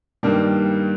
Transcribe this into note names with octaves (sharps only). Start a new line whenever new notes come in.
G2 D#3 G3 A#3